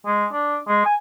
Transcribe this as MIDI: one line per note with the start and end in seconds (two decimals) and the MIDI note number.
0.06 0.26 56
0.32 0.58 62
0.68 0.84 56
0.86 0.95 80